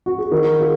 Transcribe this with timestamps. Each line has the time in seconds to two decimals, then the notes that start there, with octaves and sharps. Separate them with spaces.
0.06 F#4
0.18 G#4
0.31 D#3 F#4 A#4
0.60 F4 G#4